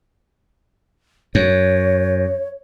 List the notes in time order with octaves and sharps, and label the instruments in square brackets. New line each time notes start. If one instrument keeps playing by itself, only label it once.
[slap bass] F#2 [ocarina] C#5